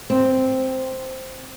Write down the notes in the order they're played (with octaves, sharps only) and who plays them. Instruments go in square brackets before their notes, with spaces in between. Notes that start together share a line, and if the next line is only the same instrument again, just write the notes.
[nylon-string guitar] C4